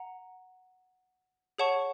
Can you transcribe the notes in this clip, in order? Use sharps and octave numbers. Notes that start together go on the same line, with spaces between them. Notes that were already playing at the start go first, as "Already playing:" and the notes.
Already playing: F#5 A#5
G#4 C#5 F#5 A5 C#6